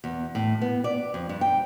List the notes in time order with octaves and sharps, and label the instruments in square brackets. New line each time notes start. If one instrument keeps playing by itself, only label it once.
[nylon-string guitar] E2
A2
B3
D5
F2
G2
G5